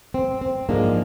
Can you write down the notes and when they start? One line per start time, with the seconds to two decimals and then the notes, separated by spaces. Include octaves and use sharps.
0.14 C4
0.41 C4
0.69 G#2 F3 G#3 A#3 D4